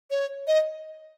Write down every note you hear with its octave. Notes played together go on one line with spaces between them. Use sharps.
C#5
D#5